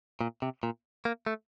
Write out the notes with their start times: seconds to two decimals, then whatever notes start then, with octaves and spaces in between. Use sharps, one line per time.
0.21 A#2
0.42 C3
0.63 A#2
1.05 A#3
1.26 A3